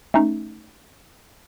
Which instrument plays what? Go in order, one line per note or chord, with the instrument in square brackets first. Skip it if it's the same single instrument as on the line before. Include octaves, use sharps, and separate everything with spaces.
[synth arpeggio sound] A3 C#4 D#4